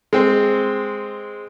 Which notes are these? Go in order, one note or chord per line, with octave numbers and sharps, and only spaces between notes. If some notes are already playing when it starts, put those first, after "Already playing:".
G#3 C4